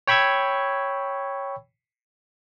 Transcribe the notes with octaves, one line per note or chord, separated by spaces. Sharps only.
C#5 G5 B5 C#6 E6 G#6